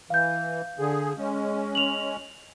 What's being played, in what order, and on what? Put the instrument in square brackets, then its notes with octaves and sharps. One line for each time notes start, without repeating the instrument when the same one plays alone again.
[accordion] E3 [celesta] F5 G6
[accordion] D3 G#4
G#3 C#4
[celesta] F7 F#7